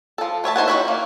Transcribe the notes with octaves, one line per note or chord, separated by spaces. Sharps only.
F3 A4
A3 C#5 E5 A5
D#4 C5 C#5 F#5
C#4 D#4 E4 F#4 E5
A#3